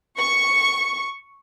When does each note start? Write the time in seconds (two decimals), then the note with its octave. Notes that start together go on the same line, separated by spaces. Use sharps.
0.19 C#6